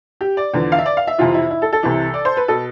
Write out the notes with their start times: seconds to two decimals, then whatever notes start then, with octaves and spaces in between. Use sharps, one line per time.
0.21 G4
0.37 D5
0.54 E2 D3 F3
0.72 F5
0.78 E5
0.86 D5
0.97 F5
1.07 E5
1.18 F2 C3 E3 F4
1.34 E4
1.51 E4
1.62 A4
1.73 A4
1.83 C2 C3 E3
2.14 D5
2.25 C5
2.37 B4
2.48 B2 A4